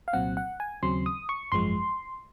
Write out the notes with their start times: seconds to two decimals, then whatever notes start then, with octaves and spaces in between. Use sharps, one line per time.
0.08 F5
0.13 C2 A#2 F#3 C4 F#5
0.37 F#5
0.60 G#5
0.83 D#2 C#3 F#3 C4 C6
1.06 D#6
1.29 C#6
1.52 G#1 F#2 F3 G#3 C6